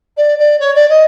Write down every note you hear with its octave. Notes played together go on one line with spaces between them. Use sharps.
D5
D5
C#5
D5
D#5